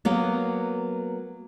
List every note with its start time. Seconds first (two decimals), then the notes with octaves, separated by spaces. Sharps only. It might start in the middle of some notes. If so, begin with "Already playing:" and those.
0.05 F#3 A#3 B3